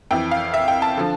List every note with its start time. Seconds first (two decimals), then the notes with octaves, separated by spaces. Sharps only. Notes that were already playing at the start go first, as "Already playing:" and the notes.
0.11 F2 E3 G5
0.31 F5
0.54 E5
0.68 G5
0.82 A5
0.97 D3 F3